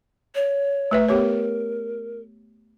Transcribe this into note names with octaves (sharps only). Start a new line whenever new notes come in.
C#5
A3 B4 E5
B3 G4 A#4 C#5